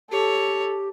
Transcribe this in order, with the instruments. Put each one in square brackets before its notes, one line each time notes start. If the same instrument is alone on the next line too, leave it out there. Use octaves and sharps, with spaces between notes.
[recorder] G4 [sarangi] A4 [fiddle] C#5